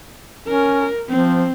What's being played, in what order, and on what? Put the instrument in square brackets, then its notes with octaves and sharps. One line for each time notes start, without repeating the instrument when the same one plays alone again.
[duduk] C#4 [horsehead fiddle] A#4
[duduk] F3 [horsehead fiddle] C4